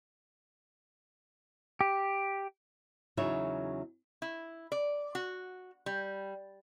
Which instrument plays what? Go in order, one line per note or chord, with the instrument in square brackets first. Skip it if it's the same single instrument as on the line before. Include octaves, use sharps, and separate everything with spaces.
[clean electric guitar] G4
[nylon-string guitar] E2 C#3 F#3 D#4 C#5 E5
[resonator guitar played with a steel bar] E4
D5
F#4
G3